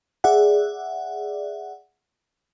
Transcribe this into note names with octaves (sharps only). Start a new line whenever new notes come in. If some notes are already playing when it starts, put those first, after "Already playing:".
G#4 D5 E5 F#5